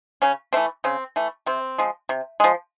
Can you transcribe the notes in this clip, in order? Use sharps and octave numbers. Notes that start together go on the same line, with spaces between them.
C#3 C#4
E3 A3 C4
C#3 C4
E3 A3
C3 C4
F3 G#3
C3
F3 G#3